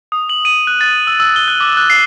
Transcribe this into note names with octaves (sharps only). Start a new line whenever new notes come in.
D#6
F#7
D#7
F#6
A6
E6
E6
G7
F#6
D6
F#6
C7